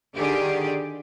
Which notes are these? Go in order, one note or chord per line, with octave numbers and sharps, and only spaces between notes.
D3 D#3 G4 G#4 D5